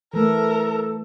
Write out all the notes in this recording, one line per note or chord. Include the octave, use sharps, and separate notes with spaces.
E3 A3 A4 A#4